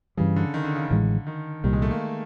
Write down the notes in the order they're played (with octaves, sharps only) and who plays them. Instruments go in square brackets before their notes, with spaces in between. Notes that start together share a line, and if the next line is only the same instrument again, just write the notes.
[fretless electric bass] G2 E3 G3 [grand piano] C#3
[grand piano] D3
D#3
D3
C#3
D3
[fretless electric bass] A1 A2 E3 G#3
[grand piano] D#3
[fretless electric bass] C2 A#2 G3 [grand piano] D#3
[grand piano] G#3
A3
A#3